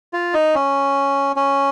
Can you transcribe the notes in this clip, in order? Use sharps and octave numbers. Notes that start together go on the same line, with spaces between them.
F4
D#4
C#4
C#4